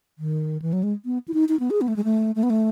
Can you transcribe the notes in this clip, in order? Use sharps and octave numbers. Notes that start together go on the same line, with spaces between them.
D#3
E3
F#3
G#3
B3
E4
D#4
D#4
B3
G#4
B3
A3
G#3
A3
A3
B3
A3